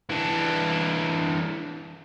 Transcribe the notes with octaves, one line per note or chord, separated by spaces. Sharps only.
E3 D4